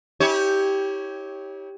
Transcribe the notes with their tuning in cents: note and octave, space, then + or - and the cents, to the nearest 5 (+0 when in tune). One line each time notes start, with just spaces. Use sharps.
E4 -45 G4 +0 C#5 +0